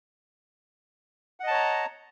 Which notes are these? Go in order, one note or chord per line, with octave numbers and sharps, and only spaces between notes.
C#5 D#5 F#5 A5 A#5